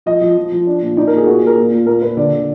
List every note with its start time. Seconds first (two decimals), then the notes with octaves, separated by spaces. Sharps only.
0.06 F3 D#5
0.21 F3
0.37 F3
0.52 F3
0.67 D4
0.82 A#2
0.97 D#4 D5
1.07 A#4
1.12 A#2 G#4
1.26 A#2 F#4
1.37 G#4
1.42 A#2 A#4
1.58 A#2
1.72 A#2
1.86 A#2 A#4
2.02 A#2 B4
2.17 D3 D5
2.33 D3